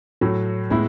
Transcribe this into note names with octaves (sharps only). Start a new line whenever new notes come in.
A2 F#3 A3
A2 G#3 B3 E4